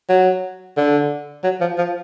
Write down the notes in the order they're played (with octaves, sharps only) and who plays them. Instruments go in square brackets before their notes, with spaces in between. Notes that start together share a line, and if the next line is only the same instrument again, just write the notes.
[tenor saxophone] F#3
D3
F#3
F3
F3